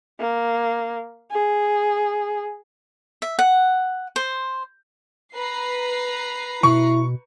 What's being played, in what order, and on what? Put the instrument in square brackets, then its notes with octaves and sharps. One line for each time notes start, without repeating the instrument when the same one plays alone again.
[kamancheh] A#3
G#4
[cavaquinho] E5
F#5
C5
[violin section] B4 A#5 C7
[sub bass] B2 [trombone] E4 [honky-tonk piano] C#6